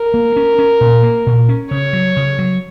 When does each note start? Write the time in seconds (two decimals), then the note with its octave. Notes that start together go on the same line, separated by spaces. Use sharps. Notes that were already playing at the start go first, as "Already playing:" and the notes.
Already playing: A#4
0.14 A#3
0.36 C#4
0.59 C#4
0.81 A#2
1.03 A#3
1.26 A#2
1.49 C#4
1.70 C#3 C#5
1.93 F#3
2.17 C#3
2.39 F#3